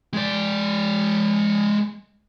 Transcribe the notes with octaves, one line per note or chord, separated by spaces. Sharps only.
G#3 D5